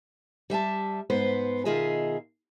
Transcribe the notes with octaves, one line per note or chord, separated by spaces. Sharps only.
G3 E5 G#5 A5
G#2 B3 B4 C5
B2 D#3 F4 G#4 D#5 E5